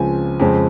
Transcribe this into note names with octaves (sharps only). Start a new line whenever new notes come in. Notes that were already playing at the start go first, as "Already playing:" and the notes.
Already playing: C#2 C#3 F3 C4 G#5
F2 C#3 G#3 C4